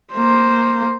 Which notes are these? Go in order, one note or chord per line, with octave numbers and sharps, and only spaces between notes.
A#3 C5